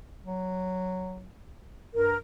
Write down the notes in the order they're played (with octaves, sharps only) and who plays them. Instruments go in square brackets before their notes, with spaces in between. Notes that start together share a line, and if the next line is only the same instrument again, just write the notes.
[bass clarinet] F#3
[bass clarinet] G2 [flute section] A#4